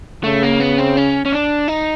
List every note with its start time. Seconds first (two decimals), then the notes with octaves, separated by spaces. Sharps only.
0.24 C#3 A3
0.43 A#3
0.60 B3
0.78 C4
0.97 C#4
1.25 C#4
1.32 D4
1.68 D#4